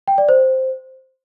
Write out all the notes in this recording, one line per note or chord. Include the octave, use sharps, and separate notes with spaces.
G5
D5
C5